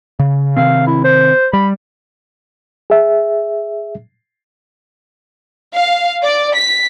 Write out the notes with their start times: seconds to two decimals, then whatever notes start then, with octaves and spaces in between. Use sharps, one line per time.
0.19 C#3
0.56 C3 D#3 C4 F5
0.87 E4
1.04 C5
1.53 G3 B5
2.90 G#4 E5
5.75 F5
6.23 D5
6.55 B6